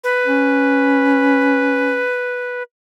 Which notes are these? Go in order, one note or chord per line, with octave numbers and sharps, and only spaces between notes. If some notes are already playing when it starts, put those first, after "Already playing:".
B4
C#4